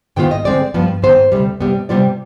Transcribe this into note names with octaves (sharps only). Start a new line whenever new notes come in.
G#2 D#3 B3 F4 G5
D#5
D3 G#3 C4 D5
G2 F3 B3
G#2 D#3 B3 C5
D2 C3 G3
C3 G3 B3
C3 G3 B3 F4 D5